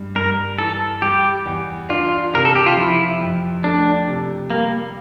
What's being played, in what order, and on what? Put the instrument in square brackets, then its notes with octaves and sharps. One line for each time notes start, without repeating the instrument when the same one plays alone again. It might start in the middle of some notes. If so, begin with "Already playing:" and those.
Already playing: [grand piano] G2
[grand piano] G2 [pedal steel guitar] A#4
[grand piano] E3 [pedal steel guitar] A4
[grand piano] G3 [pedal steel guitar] G4
[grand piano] E2
[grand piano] D4 [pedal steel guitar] F4
[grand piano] C3 [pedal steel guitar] A#4
[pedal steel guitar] A4
G4
F4
[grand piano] F3 [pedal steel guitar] E4
[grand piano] F2
[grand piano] A3 [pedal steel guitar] D4
[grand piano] C3
[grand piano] G3 [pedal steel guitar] A#3